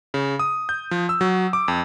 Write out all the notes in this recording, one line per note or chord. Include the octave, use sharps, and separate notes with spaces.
C#3
D#6
G6
F3
E6
F#3
D6
F2